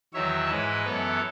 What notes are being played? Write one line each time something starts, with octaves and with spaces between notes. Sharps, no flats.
E2 D#3 F#3 C#5 E5
G#2 E3 G#3 B4 D#5
F#2 E3 B3 A4 C#5